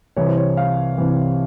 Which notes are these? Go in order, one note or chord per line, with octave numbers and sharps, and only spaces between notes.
C2 C3 E3 C#5
C5
C#5
F5
C2 C3 E3